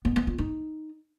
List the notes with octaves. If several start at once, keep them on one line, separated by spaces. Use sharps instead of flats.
B3
B3
F4
D#4